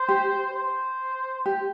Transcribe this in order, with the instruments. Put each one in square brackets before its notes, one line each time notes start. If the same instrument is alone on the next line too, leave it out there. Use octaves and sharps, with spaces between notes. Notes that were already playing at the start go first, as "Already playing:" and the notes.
Already playing: [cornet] C5
[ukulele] G4
[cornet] C5
[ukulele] G4